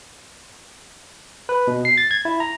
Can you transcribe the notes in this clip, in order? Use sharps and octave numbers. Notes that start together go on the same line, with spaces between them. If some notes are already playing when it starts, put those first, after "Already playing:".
B4
B2
C7
A6
G#6
E4
A#5